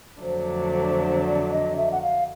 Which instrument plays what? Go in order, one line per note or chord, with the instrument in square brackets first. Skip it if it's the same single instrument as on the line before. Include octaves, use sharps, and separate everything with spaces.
[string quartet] F2 D3 F#3 A3 D4 [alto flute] C5
[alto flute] D5
D#5
E5
F#5
F5